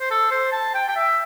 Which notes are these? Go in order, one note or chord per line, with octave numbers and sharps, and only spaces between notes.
C5
A4
C5
A5
G5
G5
E5